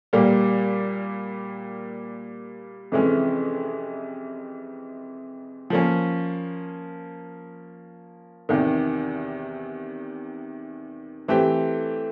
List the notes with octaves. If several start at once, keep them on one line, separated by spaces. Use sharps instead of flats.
A#2 G3 A#3
F2 C3 E3 G#3 C#4
F3 A#3 C#4
E2 C3 D#3
E3 A3 C4 E4 G4